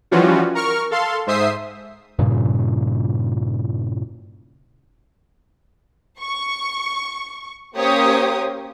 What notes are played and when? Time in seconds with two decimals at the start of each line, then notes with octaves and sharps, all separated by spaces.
0.11 E3 F3 G3 C#4 F4 F#4
0.55 A#4 C#6 F6
0.91 A4 F5 C6
1.27 G#2 C5 E5 D#6 C7
2.19 G2 A#2 C#3
6.19 C#6
7.77 A#3 C#4 G4 C5 C#5 D#6